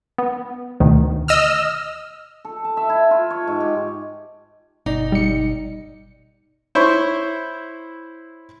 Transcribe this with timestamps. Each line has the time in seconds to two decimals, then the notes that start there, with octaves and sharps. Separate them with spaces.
0.18 B3
0.80 D2 B2 D#3
1.28 D#5 E6 F6
2.45 A4
2.64 A5
2.77 E5
2.89 E4
3.11 F4
3.30 C#5
3.48 G#2
3.60 G4
4.86 G1 B2 D#4 D5
5.12 G3 C#7
6.75 E4 C5 C#5 C#6